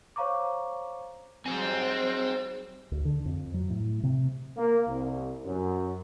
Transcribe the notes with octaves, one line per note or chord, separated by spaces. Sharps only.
C5 C#5 F5 A#5 C#6 D6
F#3 G3 C4 G#4 C5 G#5
D2
D3
F2
F#3
A2
C3
A#3
C2
F#2